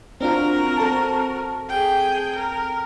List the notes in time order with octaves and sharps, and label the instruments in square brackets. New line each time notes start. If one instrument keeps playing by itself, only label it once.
[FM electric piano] C4 D4 F4 [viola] F#4 A#4
[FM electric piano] C4 A4 A5
[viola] G#4 G5
A#4